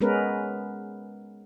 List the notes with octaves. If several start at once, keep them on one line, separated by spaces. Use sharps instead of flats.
G#3 B3 C#4 A#4 B4